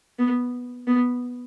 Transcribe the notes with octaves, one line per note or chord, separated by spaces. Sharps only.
B3
B3